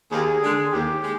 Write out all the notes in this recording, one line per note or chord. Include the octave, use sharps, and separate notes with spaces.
D#2 G#4
D3 G#3
D#2 G4
G#3